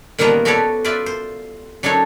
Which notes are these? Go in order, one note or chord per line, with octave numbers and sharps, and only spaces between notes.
A#2 D#3 F3 G3 A#3 B3
F#4 G4 A4 B4 C#5 D5
F4 B4 C5 D5 E5
C5
F#3 D4 D#4 A4 C#5